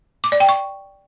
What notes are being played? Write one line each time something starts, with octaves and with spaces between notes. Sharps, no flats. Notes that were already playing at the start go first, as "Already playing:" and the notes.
D6
D5
G5
C#6